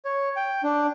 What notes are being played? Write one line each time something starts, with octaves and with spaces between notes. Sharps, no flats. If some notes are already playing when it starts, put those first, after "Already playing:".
C#5
G5
D4